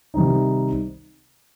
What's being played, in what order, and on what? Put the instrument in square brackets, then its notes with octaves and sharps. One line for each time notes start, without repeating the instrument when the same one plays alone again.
[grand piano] C3 D#3 G3 C4 D#4